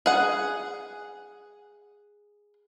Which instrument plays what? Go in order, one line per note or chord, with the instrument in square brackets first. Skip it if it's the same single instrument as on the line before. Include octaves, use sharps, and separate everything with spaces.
[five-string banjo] G#4 F#5